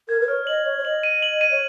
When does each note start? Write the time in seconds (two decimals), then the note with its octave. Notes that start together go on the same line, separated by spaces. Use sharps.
0.09 A#4 G#6
0.20 B4
0.28 C#5 F6
0.47 D#5 F#7
0.65 C#5 F#7
0.78 C#5
0.85 D#5 F#7
1.03 D#7
1.22 F#7
1.41 D#7
1.51 C#5